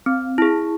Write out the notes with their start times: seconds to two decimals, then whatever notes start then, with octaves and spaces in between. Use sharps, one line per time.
0.06 C4
0.38 E4 G#4